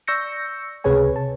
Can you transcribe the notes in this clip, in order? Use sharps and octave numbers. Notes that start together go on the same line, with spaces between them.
D5 C#6 E6 G6 A#6 C#7
C#2 C3 G#4 B4 C#5 G#5
A5